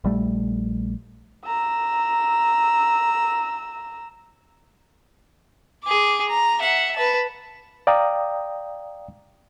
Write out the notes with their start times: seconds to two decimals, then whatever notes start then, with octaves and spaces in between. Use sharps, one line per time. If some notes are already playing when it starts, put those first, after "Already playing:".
0.04 A#1 G3 A3
1.46 A#5 E6
5.84 G#4 D6
6.29 A#5
6.60 E5 F#5
6.96 B4 A5
7.87 D5 F5 G5 A#5 D#6